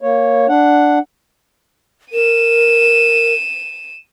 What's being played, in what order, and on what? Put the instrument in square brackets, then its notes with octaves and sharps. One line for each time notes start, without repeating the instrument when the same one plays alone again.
[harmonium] A#3 C#5
D4 F#5
[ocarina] A#4 [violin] D#7 E7